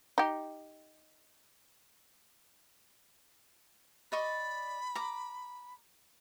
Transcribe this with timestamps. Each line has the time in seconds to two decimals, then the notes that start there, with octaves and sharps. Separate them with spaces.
0.18 D#4 G4
4.12 D5 D#5 B5 C#6
4.95 A#5 D6